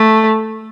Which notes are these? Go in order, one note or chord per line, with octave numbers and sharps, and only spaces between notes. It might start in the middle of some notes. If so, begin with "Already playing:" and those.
Already playing: A3